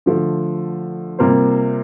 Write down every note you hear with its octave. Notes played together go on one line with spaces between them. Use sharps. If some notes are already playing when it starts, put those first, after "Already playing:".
D3 F3 A3
C3 G3 A#3 F4 C5